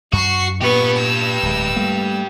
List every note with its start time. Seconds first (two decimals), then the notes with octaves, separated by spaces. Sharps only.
0.13 F#2 F#4 C#6 C7
0.62 A#2 B3 G4 B4 C#6
0.97 E6
1.43 D1 G#3
1.76 G3 A3 A#3